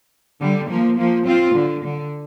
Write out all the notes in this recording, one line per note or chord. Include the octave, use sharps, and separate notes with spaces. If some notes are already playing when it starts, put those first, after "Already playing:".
D3 G3
F3 A#3
F3 A#3
C4 F4
D3
D3